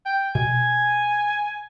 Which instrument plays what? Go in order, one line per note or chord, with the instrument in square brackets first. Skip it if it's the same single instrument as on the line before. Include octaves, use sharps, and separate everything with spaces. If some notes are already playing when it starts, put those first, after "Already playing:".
[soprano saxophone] G5
[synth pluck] B2 [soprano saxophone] G#5